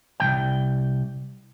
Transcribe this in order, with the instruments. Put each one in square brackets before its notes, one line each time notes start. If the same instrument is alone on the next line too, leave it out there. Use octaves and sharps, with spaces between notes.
[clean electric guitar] C2 F3 G5